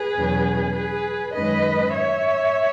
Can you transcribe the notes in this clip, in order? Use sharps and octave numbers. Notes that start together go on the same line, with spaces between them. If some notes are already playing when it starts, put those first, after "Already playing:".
Already playing: G#4 B4
E2 B2 F#3 C#4
G#4 B4
F#2 D#3 G#3 C#4 B4 D#5
C#5 E5